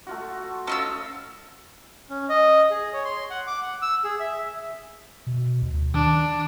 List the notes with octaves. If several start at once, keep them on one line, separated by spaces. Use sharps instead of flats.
A3 F4 F#4
C#4 F4 A4 D#5 B5 E6
C#4
D#5
G#4
C#5
C6
F#5
D6
F#5
E6
G#4
E5
B2
D2
D#3 D4